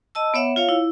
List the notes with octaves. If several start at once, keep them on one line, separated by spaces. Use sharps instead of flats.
D#5 A5 E6
B3 C#5 E5 F#5
F4 C#5 F5
E4